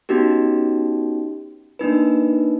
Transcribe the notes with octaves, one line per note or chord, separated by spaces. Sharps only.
B3 C#4 D#4 F#4 G4
A#3 D4 D#4 B4